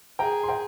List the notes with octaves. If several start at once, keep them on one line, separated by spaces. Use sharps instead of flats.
G#4 G5 A#5
C6
G5 A#5